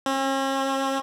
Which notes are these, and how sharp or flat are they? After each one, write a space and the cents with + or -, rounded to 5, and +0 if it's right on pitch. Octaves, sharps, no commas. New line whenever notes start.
C#4 -45